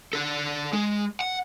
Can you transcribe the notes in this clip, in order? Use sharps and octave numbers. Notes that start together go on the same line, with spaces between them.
D4 A4
G#3
F#5